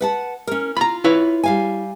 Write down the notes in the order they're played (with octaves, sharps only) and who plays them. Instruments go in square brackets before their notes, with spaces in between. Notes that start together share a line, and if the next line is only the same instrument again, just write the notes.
[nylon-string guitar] B4 F#5 A5
C#4 A#4
[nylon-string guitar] F4 [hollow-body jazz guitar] A#5 B5
[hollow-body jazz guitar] E4 B4 C#5
[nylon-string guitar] G3 F5 G#5